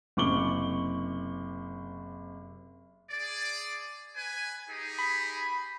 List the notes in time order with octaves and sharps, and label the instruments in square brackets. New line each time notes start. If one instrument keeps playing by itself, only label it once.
[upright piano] F#1 C3 C#6 D6 F#7 G7
[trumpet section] G#4 D5
B4 G#5
D#4 G4 G#4
[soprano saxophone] B5